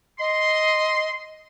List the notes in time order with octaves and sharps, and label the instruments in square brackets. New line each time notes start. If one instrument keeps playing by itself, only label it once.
[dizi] D#5 [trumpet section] C6